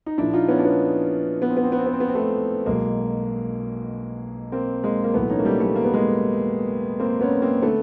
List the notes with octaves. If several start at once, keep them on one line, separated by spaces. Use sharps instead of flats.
D#4
A#1 A#2 F3 D4 E4
D#4 F4
B3 C#4
D4
B3 C#4
B3
C4
B3
C4
B3
C4
B3
C4
B3
C4
A3 B3
B1 B2 G#3 A#3
A#3 C4
G#3 A#3
A#3
B1 A2 E3 A3 B3
C#4 D#4
A#3
G3 A3
G3 A3
A#3
B3
G#3 A#3
A#3 C4
B3 C#4
A#3 C4
D3 A3 B3